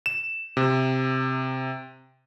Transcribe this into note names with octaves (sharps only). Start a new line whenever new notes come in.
E7
C3